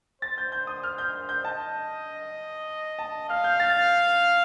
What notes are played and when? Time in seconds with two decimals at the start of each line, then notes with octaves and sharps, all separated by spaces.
0.22 C5 A6
0.38 G6
0.52 G6
0.67 D#6
0.83 F6
0.98 G6
1.29 G6
1.44 D#5 A5
2.99 A5
3.29 F5 F6
3.44 G6
3.60 A6